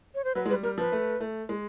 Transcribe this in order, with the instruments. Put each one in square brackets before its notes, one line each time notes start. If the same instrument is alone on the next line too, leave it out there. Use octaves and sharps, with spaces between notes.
[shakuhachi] C#5
C5
[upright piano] F#3 [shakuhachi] B4
[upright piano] G#3
[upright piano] G3 [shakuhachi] B4
[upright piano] G3 [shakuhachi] A#4
[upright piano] F3 [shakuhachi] B4
[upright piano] A3
A3
G#3